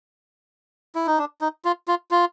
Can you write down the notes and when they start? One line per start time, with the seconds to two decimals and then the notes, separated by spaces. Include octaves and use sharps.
0.95 E4
1.07 D#4
1.18 D4
1.41 D#4
1.65 F4
1.88 F4
2.11 F4